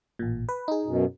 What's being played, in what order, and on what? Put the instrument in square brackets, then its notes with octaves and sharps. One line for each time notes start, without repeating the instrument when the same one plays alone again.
[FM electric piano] A1 A#2
B4
D#4 G#4
[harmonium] F#2 B2